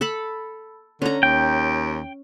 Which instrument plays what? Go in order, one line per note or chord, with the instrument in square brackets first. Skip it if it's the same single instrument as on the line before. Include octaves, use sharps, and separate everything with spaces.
[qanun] A4 A5 B5
[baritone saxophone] D3 [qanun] C#4 A#5
[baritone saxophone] D#2 [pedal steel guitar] G5